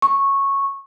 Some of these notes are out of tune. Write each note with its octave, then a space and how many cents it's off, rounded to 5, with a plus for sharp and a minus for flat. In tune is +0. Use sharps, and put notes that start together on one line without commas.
C#6 -10